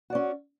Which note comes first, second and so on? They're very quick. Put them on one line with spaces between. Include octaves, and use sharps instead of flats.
F#4 D5 C#4